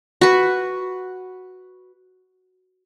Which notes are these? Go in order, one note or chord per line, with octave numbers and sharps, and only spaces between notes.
F#4 B4